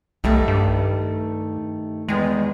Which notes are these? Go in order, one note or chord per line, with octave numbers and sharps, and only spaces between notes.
B1 D#3 G3 A3
G2
E2 D#3 G#3